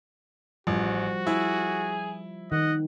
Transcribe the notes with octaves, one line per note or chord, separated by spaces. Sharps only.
A1 F3 G3 F#4
E4 G#4
D#3 D#5 F#5